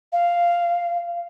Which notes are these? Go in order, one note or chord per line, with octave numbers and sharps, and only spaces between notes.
F5